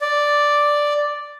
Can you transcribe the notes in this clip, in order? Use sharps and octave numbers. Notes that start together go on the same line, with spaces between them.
D5